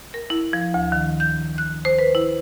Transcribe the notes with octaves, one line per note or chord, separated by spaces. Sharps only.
A#4
E4
F3
D2
D#3
G6
F#6
C5
B4
E4